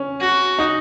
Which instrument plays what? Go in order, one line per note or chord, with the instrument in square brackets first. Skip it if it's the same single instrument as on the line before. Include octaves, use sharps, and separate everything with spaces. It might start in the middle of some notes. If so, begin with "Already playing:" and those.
Already playing: [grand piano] C#4
[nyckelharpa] F#4
[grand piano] D#4